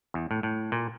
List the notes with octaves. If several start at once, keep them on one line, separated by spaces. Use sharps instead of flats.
E2
A2
A2
A#2